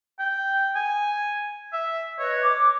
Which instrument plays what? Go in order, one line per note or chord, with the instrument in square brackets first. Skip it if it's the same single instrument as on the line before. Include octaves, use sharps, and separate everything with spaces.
[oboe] G5
G#5
E5
[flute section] B4 D#5 [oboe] C#5
[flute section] D6